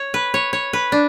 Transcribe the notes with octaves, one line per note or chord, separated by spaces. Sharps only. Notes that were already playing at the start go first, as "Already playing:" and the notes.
Already playing: C#5
B4
C#5
C#5
B4
D4